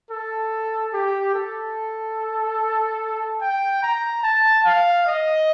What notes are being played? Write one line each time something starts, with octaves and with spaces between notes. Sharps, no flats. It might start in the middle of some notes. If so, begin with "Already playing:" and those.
A4
G4
A4
G5
A#5
A5
F5
D#5